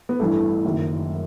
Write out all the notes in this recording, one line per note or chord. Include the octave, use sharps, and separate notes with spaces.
B3
A1 G2 E3 A3
F#1 F#2 D#3